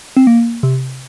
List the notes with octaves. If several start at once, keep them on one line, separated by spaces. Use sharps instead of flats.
C4
A#3
C3